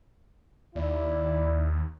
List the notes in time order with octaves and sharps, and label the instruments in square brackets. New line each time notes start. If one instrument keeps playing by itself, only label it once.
[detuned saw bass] D#2 [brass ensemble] E4 D5